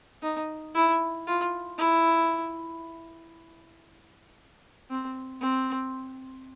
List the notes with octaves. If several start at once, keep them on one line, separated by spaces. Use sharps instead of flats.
D#4
E4
F4
E4
C4
C4